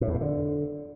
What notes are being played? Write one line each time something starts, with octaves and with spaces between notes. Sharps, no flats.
A2
E2
A2
D3